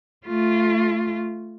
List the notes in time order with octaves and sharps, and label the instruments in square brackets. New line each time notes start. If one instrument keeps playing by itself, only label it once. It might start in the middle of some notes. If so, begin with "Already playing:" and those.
[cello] A3 F4